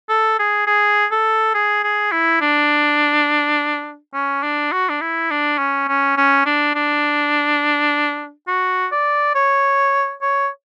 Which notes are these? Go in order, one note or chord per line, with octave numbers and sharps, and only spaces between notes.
A4
G#4
G#4
A4
G#4
G#4
E4
D4
C#4
D4
F#4
D4
E4
D4
C#4
C#4
C#4
D4
D4
F#4
D5
C#5
C#5